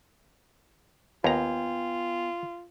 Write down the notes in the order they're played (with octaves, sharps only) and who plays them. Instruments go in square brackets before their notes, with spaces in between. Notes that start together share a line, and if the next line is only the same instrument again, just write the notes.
[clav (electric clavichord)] D#2 A#5 [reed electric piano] B3 G5 G#5 [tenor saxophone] F4